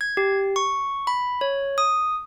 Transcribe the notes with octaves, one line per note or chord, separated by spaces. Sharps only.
G#6
G4
C#6
B5
C#5
D#6